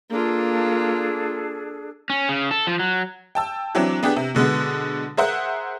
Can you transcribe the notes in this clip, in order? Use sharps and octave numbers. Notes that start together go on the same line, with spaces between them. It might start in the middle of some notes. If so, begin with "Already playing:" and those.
A#3 D4 F4 G#4 A4
C#4
C#3
A4
F3
F#3
G5 A5 E6
E3 F#3 C4 D4
B3 D4 G4 G#4
C3
B2 D3 G#3 B3
G#4 A#4 C5 E5 F#5